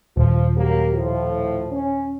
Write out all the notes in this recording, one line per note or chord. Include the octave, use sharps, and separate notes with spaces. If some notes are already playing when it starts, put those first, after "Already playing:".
D#1 F3
F#3 A#3 G4
A2 F3
C#4